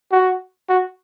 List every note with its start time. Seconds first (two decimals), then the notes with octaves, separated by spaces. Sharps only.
0.12 F#4
0.69 F#4